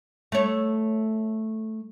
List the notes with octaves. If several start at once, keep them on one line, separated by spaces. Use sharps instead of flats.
A3 C#5